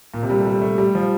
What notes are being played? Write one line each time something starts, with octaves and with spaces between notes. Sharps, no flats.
A#2
C3
G3
A3
G3
A3
G3
F3